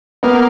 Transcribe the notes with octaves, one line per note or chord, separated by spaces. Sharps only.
A#3 B3